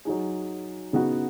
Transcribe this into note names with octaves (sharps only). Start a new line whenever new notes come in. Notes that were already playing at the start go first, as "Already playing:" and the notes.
F#3 D#4 G#4
C#3 B3 D#4 F#4